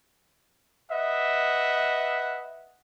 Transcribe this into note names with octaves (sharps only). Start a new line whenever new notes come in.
B4 D#5 E5 F#5